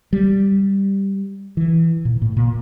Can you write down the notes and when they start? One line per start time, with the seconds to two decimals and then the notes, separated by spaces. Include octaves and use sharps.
0.13 G3
1.57 E3
2.05 A#2
2.22 A2
2.37 A#2